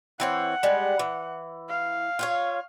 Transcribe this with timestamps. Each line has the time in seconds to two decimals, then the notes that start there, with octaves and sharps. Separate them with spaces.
0.20 E3 C4 C#5 F#5
0.63 G3 G#3
0.99 E3
1.69 F5
2.19 F4 F#4 C#5